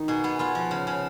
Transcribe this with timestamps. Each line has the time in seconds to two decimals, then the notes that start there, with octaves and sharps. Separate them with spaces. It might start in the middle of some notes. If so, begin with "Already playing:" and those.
Already playing: D#3 D#4
0.08 B2 G#4
0.24 B3 G#4
0.39 B3 F4
0.55 F3
0.71 C#3
0.87 C#3